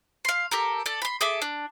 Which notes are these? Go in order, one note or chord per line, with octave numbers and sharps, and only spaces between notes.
F5 C6
G4 A4 A#4
A4 D5
B5 C6
G#4 A4 E5 D6
D4